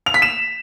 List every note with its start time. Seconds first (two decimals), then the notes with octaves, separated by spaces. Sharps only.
0.06 F7
0.14 B6
0.22 E7